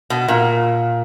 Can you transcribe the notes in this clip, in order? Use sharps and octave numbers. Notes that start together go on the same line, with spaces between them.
B2
A#2